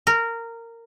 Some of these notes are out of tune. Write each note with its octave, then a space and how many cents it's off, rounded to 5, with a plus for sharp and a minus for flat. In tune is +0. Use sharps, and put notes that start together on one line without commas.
A#4 -15